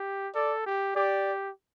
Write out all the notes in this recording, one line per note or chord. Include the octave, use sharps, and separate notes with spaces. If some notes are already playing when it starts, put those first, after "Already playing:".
Already playing: G4
A4 D5
G4
G4 D5